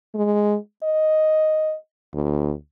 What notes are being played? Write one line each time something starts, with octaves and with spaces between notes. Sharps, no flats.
G#3
D#5
D2